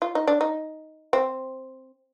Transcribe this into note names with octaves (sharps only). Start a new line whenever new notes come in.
F4
D#4
D4
D#4
C4